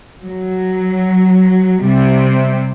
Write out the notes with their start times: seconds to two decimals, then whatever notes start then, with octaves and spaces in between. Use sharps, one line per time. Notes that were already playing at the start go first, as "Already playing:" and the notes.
0.25 F#3
1.83 C3 G3 C4